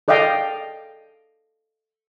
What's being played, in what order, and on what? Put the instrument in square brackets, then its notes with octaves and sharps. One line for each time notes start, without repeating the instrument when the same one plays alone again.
[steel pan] A4 D5 D#5 F5 G5